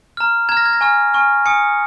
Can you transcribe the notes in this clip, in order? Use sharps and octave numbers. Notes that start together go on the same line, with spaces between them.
A#5 F6
A#5 F6 G#6
A#6
G#6
A#6
G#5 C#6 F6
G#5 C#6 F6
G#5 D#6 C#7